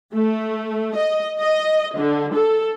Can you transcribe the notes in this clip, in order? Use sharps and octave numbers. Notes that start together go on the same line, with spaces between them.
A3
D#5
D#5
D3
A4